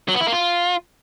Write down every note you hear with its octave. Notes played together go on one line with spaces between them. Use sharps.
F#3
B3
E4
A#3
F4